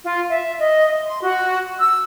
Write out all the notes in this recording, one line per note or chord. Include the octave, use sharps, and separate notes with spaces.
F4
E5
D#5
C6
F#4
E6